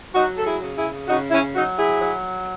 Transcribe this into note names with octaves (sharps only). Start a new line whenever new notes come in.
F#3 D#4 F#4
A4
E4 G#4
C#3
E4 G#4
C#3 D#4 F#4
C#4 E4
F#3 D#4 F#4
E4 G#4
F#3